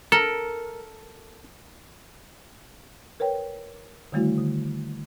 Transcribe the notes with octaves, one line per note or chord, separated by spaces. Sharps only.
A4 A#4
A#4 B4 C#5 G5
D3 D#3 G3 A3 E4 F#4
D3